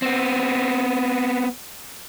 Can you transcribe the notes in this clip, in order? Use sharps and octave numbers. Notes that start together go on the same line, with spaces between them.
B3 C4